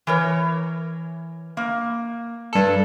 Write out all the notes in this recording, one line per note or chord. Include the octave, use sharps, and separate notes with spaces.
E3 A#4 C#5
A#3
G2 A4